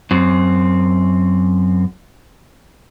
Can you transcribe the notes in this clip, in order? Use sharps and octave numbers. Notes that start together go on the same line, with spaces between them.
F#2 C4